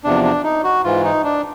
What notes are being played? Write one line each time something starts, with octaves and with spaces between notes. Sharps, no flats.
E2 C3 F3 D4
D4
D#4
F#4
G#2 E3 F4
D#4
D4